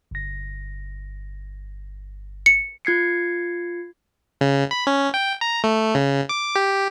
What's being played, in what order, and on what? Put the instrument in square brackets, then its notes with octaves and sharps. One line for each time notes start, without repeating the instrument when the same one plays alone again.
[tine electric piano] G1 A#6
[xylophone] C#7
[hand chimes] F4 G#6 C7 C#7
[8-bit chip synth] C#3
B5
C#4
G5
A#5
A3
C#3
D6
G4